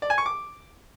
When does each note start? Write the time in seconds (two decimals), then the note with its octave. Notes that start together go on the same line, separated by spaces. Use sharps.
0.02 D5
0.10 G#5
0.18 C#6
0.26 D6